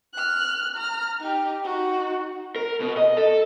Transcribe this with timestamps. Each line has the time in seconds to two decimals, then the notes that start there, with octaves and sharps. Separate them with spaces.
0.14 F6 F#6
0.76 A#5 F6
1.20 D#4 G4
1.64 D#4 F#4
2.56 A#4
2.81 B2
2.97 D#5
3.17 A4